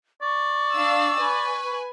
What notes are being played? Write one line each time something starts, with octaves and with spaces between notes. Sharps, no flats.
D5 C#6
D4 F5 E6
B4 G#5